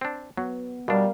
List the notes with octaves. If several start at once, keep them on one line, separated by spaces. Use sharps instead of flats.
C4 D4
F#3 B3
B2 G3 D4 A#4 F5